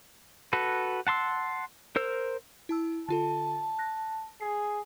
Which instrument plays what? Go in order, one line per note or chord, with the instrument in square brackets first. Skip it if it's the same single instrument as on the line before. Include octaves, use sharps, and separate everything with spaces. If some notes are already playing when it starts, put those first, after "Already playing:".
[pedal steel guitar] F#4 A4 B4
F#5 A5 C6 E6
A#4 C5 E6
[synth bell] E4 A5 E6
[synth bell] D3 F4 A4 [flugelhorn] A5
[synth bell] F#6 A#6
[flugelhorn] G#4 [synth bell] C7